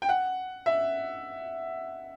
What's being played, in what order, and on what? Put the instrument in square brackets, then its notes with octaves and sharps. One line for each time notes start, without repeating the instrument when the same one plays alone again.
[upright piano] G5
F#5
E5